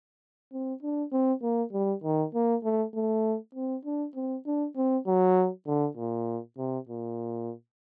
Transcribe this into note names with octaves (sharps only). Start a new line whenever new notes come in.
C4
D4
C4
A#3
G3
D#3
A#3
A3
A3
C4
D4
C4
D4
C4
F#3
D3
A#2
C3
A#2